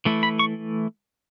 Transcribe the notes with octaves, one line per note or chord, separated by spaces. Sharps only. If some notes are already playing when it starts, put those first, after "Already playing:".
E3 A3 E4
B5
C#6